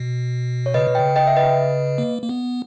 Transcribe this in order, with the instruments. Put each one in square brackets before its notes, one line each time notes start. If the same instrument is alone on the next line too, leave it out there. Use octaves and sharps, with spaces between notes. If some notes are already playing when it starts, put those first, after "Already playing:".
Already playing: [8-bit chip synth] B2
[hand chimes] C#5
[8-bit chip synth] C#3 [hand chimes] B4 D#5
[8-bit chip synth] B2
[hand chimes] D#5 G5
[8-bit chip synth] C#3
[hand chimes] D#5 G5
E5
B4 D#5
[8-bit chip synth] A#3
A#3
B3